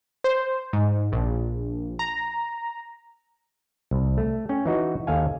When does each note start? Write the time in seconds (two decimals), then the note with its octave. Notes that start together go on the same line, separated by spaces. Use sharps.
0.24 C5
0.73 G#2
1.12 A#1
1.99 A#5
3.91 C2
4.17 A3
4.49 C#4 G5
4.66 E3 D#4 F#4
5.07 D#2 A4 F5 G#5